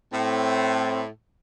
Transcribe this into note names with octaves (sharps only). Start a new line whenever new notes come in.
A2 C4